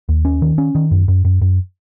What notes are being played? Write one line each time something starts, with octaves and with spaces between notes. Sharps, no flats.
D#2
C#4
D#3
C#4
D#3
F#2
F#2
F#2
F#2